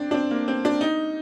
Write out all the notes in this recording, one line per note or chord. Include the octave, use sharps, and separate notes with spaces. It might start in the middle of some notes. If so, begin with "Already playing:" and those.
Already playing: C4 D4
D4
C4
A#3
C4
D4
D#4